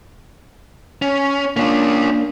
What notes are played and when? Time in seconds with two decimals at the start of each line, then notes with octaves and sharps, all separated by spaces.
1.02 C#4
1.57 A#3 C#4 D4 F4